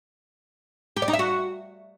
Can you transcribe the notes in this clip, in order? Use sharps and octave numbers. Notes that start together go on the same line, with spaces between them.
G4
D5
D#4
E5
F#4